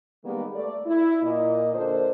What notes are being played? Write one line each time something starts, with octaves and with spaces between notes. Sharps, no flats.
D#3 G3 G#3 A#3 B3
A3 D5
E4
A#2 D#5
D3 A#3 D4 A4 C5